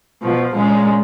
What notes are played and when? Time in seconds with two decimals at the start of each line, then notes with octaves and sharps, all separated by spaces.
0.22 B2 F3
0.53 A#2 G#3 C#4